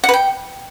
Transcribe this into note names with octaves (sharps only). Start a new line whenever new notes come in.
F#5
B4
G5